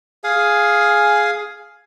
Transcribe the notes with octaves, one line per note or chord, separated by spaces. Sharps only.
G#4 F5 G#5